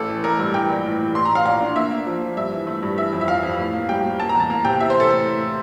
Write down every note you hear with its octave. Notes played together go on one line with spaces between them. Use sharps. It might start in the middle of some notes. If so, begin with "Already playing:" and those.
Already playing: A1 A4
E3
A1 A#4
G2
E3 G5
A#1
A2
E3
A2 C6
A2 A#5
F5
A#1 F5
D4
A#3 E5
A#3
F3
F3
G2 E5
E3
A3
G2
E3 E5
F2
E5
F2 F5
F2
A2
A#3
G3 G5
G3
A#3 A5
A#5
E2
A5
A#3
C3 G5
E3 E5
C5
E3 A4
A2 A4
A2